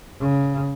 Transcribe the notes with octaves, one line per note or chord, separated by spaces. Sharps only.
C#3